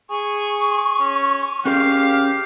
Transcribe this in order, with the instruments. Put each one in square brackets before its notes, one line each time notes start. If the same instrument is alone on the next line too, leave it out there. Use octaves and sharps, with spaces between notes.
[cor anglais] G#4 [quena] C#6
[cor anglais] C#4
[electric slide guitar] C#4 G#4 A#4 [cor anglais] G4 [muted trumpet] F5